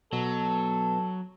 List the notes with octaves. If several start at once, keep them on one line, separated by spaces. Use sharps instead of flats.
B2 F#3 A4